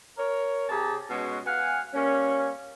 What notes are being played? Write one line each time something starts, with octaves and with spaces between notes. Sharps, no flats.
A#4 C#5
C3 G4 G#4 A5 A#5
B2 G#3 C#4 F#4
B3 F5 F#5 G#5
G3 A#3 C#4